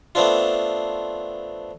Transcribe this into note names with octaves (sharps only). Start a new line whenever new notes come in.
A3 B3 C4 D4 F4